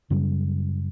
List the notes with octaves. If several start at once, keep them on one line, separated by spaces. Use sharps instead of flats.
F#2 C#3 F#3 G3